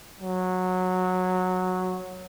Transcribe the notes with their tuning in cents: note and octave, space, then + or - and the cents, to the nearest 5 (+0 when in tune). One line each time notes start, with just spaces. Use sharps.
F#3 -10